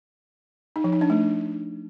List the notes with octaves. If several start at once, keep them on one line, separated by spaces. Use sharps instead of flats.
D#4
F3
D#4
D4
A3